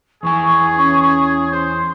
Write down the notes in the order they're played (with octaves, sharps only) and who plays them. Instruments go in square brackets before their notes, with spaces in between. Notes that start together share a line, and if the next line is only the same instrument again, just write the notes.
[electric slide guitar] E2 E3 G#5 [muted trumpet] G#4 [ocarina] C#6
[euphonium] C#4
[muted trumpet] C5 [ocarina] C6